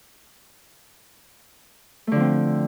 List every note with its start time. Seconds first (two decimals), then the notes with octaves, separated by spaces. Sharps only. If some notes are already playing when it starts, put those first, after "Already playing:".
2.07 A3
2.12 D3
2.16 F3
2.20 C4